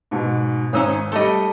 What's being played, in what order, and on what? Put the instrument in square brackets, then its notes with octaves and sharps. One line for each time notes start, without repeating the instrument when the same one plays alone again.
[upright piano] G#2 B2
[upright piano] G#1 D#6 E6 [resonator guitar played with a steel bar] C#4 D#4 C#5
[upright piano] G3 A4 [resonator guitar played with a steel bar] A3 D#5